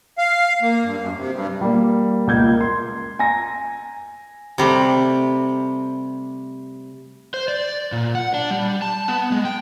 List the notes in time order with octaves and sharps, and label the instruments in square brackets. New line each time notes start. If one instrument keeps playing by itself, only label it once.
[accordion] F5
A#3
G2
F#2
C3
G2
[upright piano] G3 A#3
C#2 A#3 G6 G#6
C6
G#5 A#5 A#6
[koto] C3 G3 A3
[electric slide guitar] C5
D5
A#2
F#5
D4
G3
A5
B3
G#3
G5